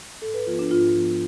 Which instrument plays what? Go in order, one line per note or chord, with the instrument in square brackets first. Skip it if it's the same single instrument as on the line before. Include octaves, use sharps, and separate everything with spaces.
[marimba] G#2 A4
B4
F3 B3 F4
D4
G#2 F4
F3 B3